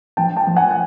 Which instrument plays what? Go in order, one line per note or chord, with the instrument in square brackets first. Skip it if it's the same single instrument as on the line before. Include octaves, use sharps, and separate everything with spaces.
[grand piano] F3 G5 A5
G5 A5
F3
F#5 G#5
F#5